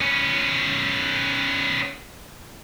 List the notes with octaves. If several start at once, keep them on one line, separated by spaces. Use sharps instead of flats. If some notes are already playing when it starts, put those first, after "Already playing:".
B3 C#4